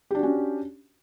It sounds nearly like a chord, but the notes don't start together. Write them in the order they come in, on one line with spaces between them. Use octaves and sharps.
G4 D4 F#4 C#4